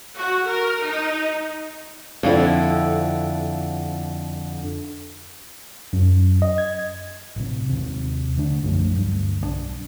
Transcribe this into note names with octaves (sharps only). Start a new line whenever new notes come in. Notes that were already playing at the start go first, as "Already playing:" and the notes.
F#4
A#4
D#4
F2 D3 E4
F#2
D#5
G#6
A1 C3
D#2 C3
D3 A3 D4
B1 F#2 F3 A3
D2 G2 G3
B1 F3 D4